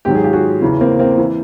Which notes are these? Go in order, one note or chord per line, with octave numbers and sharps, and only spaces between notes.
G#2 D#3 F#3 G4
G#4
F4 G4
F#4 G#4
E2 C#3 E3
A#3 C4
A#3 C4
E3